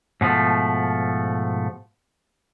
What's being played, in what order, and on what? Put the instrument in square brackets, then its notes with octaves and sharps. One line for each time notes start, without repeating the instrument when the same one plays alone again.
[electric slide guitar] G#2 B2 F3 A3